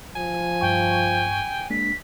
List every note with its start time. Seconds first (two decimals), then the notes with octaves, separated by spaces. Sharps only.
0.16 F3 G#5
0.61 G2 G5 C#6
1.70 G#3 A#3 D4 B6